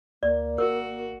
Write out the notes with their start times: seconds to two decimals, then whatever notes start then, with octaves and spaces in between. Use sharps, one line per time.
0.23 D2 A#3 D5
0.58 G#1 F#4 A#4